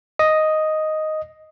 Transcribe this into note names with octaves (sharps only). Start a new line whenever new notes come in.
D#5